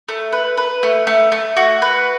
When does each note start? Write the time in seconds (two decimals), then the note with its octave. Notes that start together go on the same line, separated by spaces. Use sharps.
0.09 A3
0.32 B4
0.57 B4
0.83 A3
1.07 A3
1.32 A3
1.57 F#4
1.82 B4